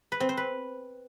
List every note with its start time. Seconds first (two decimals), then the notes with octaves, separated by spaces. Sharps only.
0.12 B4
0.20 C4
0.29 C5
0.37 B4